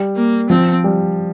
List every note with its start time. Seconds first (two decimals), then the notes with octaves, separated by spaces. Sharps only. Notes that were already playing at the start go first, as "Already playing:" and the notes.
Already playing: G3
0.16 A#3
0.50 F3 C4
0.84 G3